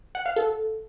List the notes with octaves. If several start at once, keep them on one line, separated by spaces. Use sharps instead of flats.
F#5
F5
A4